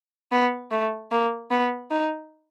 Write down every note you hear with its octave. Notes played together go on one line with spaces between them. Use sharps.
B3
A3
A#3
B3
D#4